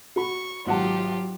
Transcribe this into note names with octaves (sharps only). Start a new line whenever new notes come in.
F#4 B5 C#6
G#1 F#3 F4 G4 F#5 A5